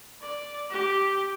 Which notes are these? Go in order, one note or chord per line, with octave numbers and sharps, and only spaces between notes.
D5
G4